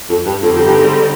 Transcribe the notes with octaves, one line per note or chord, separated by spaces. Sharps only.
F2
G2
F2 D3 G3 C4 D#4
F2
G2
G#2